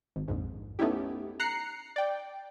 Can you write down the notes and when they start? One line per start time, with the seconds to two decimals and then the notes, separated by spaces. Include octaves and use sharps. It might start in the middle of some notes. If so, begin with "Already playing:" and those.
0.16 G#1
0.28 A#1 F2 G#2
0.79 A3 B3 C#4 D#4 E4 G4
1.40 A#5 F#6 C7 C#7
1.96 D5 G5